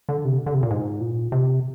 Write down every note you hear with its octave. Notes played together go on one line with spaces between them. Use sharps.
D3
C3
D3
C3
A#2
G#2
A#2
C3